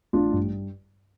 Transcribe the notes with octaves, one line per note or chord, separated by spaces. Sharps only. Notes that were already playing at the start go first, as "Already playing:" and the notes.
A1 D4 F4
G2